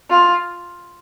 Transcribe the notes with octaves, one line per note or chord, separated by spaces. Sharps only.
F4